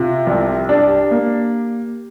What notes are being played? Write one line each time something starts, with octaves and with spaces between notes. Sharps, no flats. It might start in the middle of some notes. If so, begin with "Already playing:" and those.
Already playing: C3 F4
C2
D4 G4
A#3